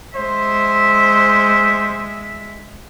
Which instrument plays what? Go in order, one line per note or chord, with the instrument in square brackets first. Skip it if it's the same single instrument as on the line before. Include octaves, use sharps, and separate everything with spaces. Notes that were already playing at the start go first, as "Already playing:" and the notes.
[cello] G#3 E5 [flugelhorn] C5